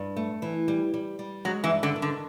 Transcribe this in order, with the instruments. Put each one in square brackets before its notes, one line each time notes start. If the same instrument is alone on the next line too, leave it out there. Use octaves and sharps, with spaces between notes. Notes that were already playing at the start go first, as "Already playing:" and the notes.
Already playing: [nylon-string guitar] G2
A3
E3
G3
G3
G3
[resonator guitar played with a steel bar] F#3 [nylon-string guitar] G#3
[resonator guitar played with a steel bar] E3
[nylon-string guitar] G2
[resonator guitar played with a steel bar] D3
[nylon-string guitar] D#3
[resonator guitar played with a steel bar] D3